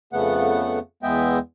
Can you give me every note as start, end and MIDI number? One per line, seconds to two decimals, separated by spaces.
0.13 0.79 41
0.13 0.79 49
0.13 0.79 57
0.13 0.79 59
0.13 0.79 78
1.03 1.38 40
1.03 1.38 56
1.03 1.38 59
1.03 1.38 75
1.03 1.38 76
1.03 1.38 79